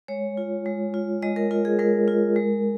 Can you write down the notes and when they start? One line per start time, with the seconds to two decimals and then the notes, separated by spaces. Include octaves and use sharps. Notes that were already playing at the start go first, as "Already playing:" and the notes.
0.08 G#3 C#5
0.37 F4
0.66 G#3
0.94 F4
1.22 G#3 D#5
1.36 A#4
1.51 F4 A#4
1.65 G#4
1.79 G#3 A#4
2.08 F4
2.36 G#3